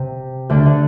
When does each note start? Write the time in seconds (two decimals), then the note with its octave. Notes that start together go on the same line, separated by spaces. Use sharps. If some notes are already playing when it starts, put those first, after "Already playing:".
Already playing: C3
0.49 D2 D3
0.66 D3